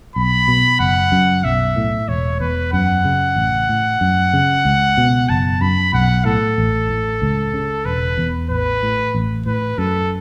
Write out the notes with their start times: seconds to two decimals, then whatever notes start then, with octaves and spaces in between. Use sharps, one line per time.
0.16 B1 B5
0.48 B2
0.80 F#1 F#5
1.12 F#2
1.44 B1 E5
1.76 A2
2.08 E1 C#5
2.40 E2 B4
2.73 F#2 F#5
3.05 C#3
3.36 A1
3.69 A2
4.01 F#2
4.33 C#3
4.65 C#2
4.97 B2
5.29 F#1 A5
5.61 F#2 B5
5.93 B1 F#5
6.25 A2 A4
6.58 A1
6.89 A2
7.22 C#2
7.54 C#3
7.85 E1 B4
8.18 E2
8.50 A1 B4
8.83 A2
9.14 A1
9.46 A2 B4
9.78 F#2 A4